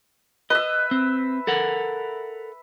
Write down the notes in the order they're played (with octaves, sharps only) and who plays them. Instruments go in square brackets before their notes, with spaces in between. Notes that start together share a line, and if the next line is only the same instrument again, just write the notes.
[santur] B4 E5 [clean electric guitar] D#5
[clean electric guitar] C4
A4 A#4 F#5